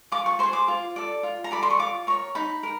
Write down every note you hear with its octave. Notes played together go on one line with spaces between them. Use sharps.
F4 D6
C#6
G#4 C5 C6
D6
F4
A4 D5
F4
A#5
A4 D5 B5
C6
C#6
F4 D6
A#4 C#5 C#6
D#4 B5
A#4